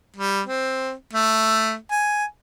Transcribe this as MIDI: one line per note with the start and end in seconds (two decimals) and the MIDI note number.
0.16 0.41 55
0.46 0.93 60
1.13 1.75 57
1.91 2.24 80